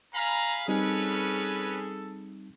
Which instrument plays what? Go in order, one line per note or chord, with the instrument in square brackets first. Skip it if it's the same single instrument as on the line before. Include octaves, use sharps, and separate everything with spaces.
[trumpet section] F5 B5 [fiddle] G#5 [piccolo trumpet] A#5
[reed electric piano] G3 C4 D#4 [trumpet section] C#4 B4 [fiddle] G#4 [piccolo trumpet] A4